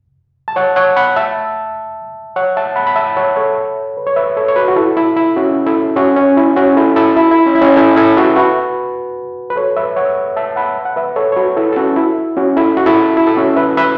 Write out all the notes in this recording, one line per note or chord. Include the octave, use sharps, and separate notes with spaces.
A5
C#5 F#5
C#5 F#5
F#5 B5
E5 A5
C#5 F#5
E5 A5
F#5 B5
B5
E5 A5
C#5 F#5
A4 C#5
B4
C#5
B4 E5
A4 C#5
C#5
F#4 B4
F#4
E4 A4
E4
E4
C#4 F#4
E4 A4
C#4 F#4
C#4
E4
C#4 F#4
E4 A4
E4 A4
E4
E4
C#4
E4
C#4
E4 A4
E4 A4
F#4 B4
F#4 B4
B4
A4 C#5
B4 E5
C#5 F#5
E5 A5
F#5 B5
F#5
B4 E5
A4 C#5
C#5
F#4 B4
E4 A4
A4
C#4 F#4
E4
C#4 F#4
E4 A4
F#4
E4 A4
E4
A4
C#4 F#4
B4 E5
B4 E5